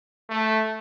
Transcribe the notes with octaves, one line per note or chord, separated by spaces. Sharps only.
A3